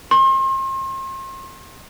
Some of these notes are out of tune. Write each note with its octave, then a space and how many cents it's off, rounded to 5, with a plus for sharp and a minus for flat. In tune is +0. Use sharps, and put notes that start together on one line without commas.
C6 +40